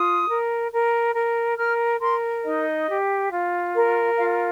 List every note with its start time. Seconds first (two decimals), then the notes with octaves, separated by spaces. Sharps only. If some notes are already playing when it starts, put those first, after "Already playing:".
Already playing: F4 D#6
0.28 A#4
0.71 A#4
1.14 A#4
1.57 A#4 F6
2.01 A#4 C6
2.44 D#4 D#5
2.87 G4
3.31 F4
3.74 A#4
4.17 F4 F5